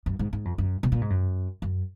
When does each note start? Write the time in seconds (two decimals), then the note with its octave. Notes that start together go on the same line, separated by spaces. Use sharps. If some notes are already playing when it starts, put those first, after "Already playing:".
0.06 F#2
0.19 G#2
0.33 G#2
0.45 F2
0.58 F#2
0.83 B2
0.92 A#2
1.01 G#2
1.10 F#2
1.62 F#2